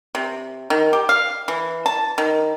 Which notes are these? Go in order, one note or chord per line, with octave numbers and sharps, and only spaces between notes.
C3
D#3
G4
F5
E3
A5
D#3